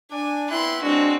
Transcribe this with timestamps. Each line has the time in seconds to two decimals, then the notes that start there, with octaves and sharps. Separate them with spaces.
0.11 D4 G#5
0.50 B3 C4 E4 C6 F#6
0.83 B2 F#3 G#3 C4 D4 F#4